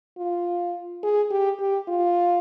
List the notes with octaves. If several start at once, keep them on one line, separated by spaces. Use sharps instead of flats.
F4
G#4
G4
G4
F4